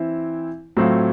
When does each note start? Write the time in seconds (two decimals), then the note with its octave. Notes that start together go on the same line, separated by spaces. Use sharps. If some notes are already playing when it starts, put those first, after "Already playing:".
Already playing: E3 C4 E4
0.77 A2 F#3 A3 C4 F4